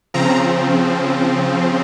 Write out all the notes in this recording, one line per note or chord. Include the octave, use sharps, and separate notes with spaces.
C#3 F3 C4 A#5